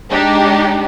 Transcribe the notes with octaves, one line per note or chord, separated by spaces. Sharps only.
G#3 D4 D#4 G4